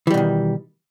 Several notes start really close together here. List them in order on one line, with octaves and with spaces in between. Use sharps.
E3 G3 B2 D#3